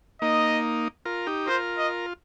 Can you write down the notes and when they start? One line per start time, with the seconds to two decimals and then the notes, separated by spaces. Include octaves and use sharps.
0.22 A#3 D#4 D#5
1.05 F4 A#4
1.27 D#4 G4
1.47 F4 A#4 C5
1.78 D#5